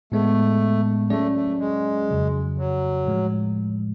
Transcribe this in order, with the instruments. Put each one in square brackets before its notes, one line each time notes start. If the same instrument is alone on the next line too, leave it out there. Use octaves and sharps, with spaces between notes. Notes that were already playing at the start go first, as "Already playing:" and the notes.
[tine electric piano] A2 G#3 B3 [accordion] A3
[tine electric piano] F#3 C#4 G#4 D5 [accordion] A3
[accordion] A3
G#3
[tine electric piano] F2 C#3 F#3
[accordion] F#3
[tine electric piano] A2 F3 G#3